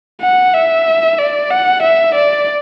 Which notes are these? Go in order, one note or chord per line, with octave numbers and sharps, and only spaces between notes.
F#5
E5
D5
F#5
E5
D5